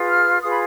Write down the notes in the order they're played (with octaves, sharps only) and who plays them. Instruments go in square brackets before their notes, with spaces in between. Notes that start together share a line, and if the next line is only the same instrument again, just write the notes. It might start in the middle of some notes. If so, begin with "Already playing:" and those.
Already playing: [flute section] F4 G#4 B4
F6
F4 G#4 B4 D#6
B5